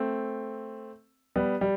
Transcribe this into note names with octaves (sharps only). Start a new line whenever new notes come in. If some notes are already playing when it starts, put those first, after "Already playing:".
Already playing: A3 C4
G3 B3
G3